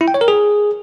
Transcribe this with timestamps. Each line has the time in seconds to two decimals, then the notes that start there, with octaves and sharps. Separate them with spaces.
0.01 E4
0.08 G5
0.14 C#5
0.21 A#4
0.28 G#4